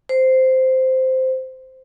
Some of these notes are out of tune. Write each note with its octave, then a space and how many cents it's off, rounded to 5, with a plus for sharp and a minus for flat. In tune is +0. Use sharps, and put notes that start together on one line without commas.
C5 -10